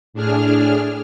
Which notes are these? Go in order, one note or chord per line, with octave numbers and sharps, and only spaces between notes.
A2 D4 G#4 F6